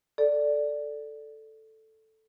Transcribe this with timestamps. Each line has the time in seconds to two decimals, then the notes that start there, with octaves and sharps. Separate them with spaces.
0.18 A4 D5